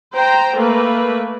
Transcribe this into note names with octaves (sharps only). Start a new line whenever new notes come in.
C5 G5 A#5
A3 A#3 B4